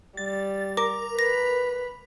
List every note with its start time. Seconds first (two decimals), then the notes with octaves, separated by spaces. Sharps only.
0.17 G3 A6
0.77 A#4 D6
1.19 B4 A#6